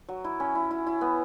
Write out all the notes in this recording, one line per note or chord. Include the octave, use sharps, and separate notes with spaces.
F#3
E4
C#4
E4
E4
E4
B3